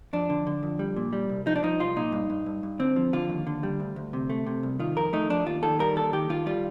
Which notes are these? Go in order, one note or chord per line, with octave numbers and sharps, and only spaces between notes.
F2 D4
D3
D3
F2
G3
A#2
G3
C2
F3 D#4
D4
F3 D#4
C2 F4
A#2 D#4
G2
G2
G2
G2
D3 C4
F3
D3 F4
D#2
D3
G3
D2
D2
C3
A3
C3
C2
D#3 F4
F2 A#4
A3 D#4
F2 D4
D#2 F4
D#3 A4
G3 A#4
D#2 A4
D#3 G4
D#3 F4
G3 F4